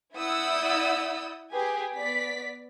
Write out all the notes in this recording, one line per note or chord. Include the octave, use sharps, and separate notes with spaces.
E4 D5 F#5 D#6 E6 G6
G4 G#4 B4 G#5
B3 D5 B6